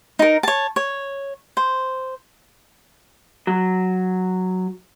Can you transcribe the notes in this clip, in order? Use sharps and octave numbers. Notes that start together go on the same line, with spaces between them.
D#4 A#4
C#5 A5
C#5
C5
F#3